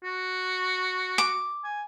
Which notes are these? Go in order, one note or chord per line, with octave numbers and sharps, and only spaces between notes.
F#4
D6
G#5